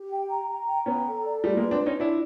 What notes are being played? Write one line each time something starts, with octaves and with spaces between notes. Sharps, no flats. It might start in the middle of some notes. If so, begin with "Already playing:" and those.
Already playing: G4
G5
A#5
A#5
G5
B3 C#4 A#5
A4
D5
G3 A3 F4
G#3 A#3
B4
C4 D4
F4
C#4 D#4
D4 E4 F4